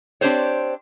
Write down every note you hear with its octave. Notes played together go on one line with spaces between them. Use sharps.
C4 D4 G4 C5 C#5